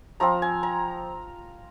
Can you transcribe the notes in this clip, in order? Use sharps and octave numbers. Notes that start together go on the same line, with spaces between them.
F3 C4 F4 A#5
G#5
A#5